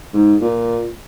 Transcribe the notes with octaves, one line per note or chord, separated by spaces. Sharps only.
G#2
A#2